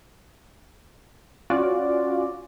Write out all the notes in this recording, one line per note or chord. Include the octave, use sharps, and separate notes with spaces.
C#4 F4 F#4 D5